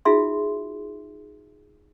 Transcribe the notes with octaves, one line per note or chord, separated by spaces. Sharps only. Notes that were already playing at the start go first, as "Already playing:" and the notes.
D#4 F4 F#4 G#4 E5 C6